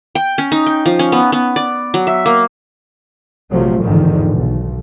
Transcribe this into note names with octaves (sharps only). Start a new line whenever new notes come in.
G5
C#4
D#4
G5
F3
C#4
B3
B3
D5
F#3
E5
A#3
A#1 C3 F3 F#3 A3
A1 E2 G#2 D3 D#3 F3
B1